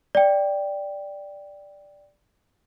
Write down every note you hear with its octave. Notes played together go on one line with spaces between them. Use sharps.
D5 G5